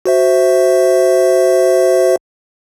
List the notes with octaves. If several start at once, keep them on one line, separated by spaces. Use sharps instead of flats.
F#4 C5 E5